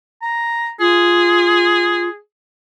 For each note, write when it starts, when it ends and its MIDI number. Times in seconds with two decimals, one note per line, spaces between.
0.22 0.71 82
0.80 2.09 65
0.80 2.18 68